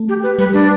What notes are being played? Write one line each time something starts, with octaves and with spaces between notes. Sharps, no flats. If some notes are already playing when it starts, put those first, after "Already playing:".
Already playing: A3
G4
B4
G3 B4
D4